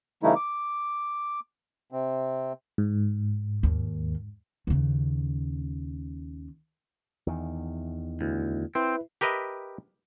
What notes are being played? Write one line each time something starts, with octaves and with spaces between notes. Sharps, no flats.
C#3 E3 G3 A3 D#4 E4
D6
C3 C4
G#2
D#2
D#2 C#3
E2 D#3
D2 E4
C4 E4 B4 E5
G4 A#4 B4 D#5 E5